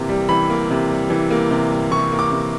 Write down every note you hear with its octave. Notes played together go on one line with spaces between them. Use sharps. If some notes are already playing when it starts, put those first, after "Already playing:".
Already playing: C3 E3 A#3
G3
E3 B5
A#3
C3
G3
E3
A#3
C3
G3
E3 C#6
A#3
D6
C3